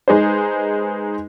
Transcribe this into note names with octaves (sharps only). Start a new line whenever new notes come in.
G#3 D#4 G#4 B4 C5